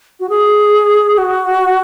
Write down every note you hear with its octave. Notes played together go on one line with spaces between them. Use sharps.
F#4
G#4
F#4